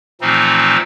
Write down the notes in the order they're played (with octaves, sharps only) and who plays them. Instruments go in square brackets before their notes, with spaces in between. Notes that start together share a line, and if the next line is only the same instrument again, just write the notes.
[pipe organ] A#2 E3 F3 A3 C4 D#4